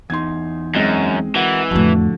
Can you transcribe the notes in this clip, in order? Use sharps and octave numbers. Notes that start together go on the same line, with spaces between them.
E2 D#4 C6 G#6
F#2 G#3 C4 D#5
E3 F#4 A#4 F#5
F2 A2 D3 F3 F#4